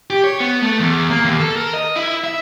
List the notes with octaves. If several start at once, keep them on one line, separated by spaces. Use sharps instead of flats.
G4
C#5
B3
A3
E2
A#3
D#2
A4
A#4
D#5
E4
E5